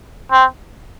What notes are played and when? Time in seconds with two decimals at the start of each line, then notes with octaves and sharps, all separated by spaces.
0.32 C4